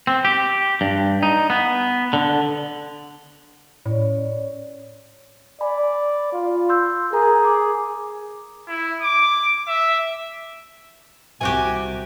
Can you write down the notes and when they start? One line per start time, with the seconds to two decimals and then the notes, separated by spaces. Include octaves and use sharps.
0.07 C4
0.25 G4
0.81 G2
1.23 D#4
1.50 B3
2.13 D3
3.86 A2 C#4 C#5 D5
5.61 D5 G#5 B5
6.33 F4
6.69 C6 E6 G6
7.13 G#4 A#4 A#5
7.45 D6
8.68 E4
9.02 D6
9.68 E5
11.41 C2 C3 F#4 G4 G#5